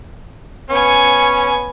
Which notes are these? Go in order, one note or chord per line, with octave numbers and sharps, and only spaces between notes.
B3 C#4 G#5 C#6